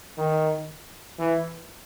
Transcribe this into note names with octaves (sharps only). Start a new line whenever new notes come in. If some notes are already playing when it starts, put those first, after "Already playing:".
D#3
E3